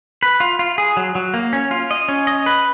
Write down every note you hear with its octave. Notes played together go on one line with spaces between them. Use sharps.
B4
F4
F4
G#4
F#3
F#3
A#3
C#4
F4
D#5
C#4
D#5
B4